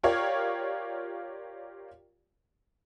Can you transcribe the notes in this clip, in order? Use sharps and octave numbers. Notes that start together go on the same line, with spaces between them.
F4 G4 A#4 C#5 D5 F5